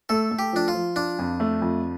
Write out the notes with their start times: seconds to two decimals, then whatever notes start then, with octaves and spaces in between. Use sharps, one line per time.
0.09 A3 A4
0.31 A3
0.39 G4
0.53 F3 D4
0.68 F4
0.74 F3
0.96 D4 F4
1.19 F2
1.40 A3
1.62 F2